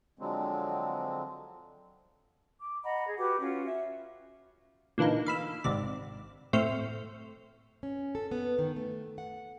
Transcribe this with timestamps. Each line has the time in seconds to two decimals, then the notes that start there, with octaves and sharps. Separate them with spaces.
0.19 D3 F3 F#3 G#3 C4
2.59 D6
2.84 D#5 F#5 A#5 B5
3.04 G#4
3.18 F#4 G4 B4 D6
3.39 C#4 F4 F#4
3.66 E5
4.98 A#2 D3 E3 A#3 D#4
5.26 F5 B5 E6
5.64 G#1 G#2 C3 D5
6.53 A2 A3 C4 C6 C#6 F6
7.83 C#4
8.15 A4
8.31 B3
8.59 D#3
8.76 A3
9.18 F#5